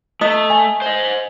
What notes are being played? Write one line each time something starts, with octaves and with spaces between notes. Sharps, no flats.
A3 E4 D#5 D#6
E5 G#5
C5 D#5